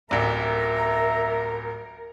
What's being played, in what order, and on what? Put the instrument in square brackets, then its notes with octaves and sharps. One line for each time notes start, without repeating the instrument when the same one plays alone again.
[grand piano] D1 A1 [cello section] A#4 [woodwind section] E5 A#5